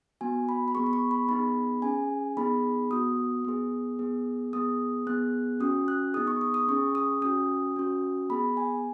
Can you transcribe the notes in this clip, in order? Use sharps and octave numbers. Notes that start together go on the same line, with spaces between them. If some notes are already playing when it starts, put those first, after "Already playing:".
B3 F#4 G#5
B5
B5
B3 G#4 C#6
B5
C#6
B5
B3 D#4 G#4 B5
C#4 G#4 G#5
B3 D#4 G#4 B5
B3 F#4 D#6
B3 G#4
B3 G#4
B3 G#4 D#6
B3 G#4 F#6
C#4 F#4 D#6
F#6
B3 D#4 G#4 D#6
C#6
D#6
D#6
C#4 G#4 C#6
D#6
C#4 F#4 D#6
C#4 F#4
B3 G#4 B5
G#5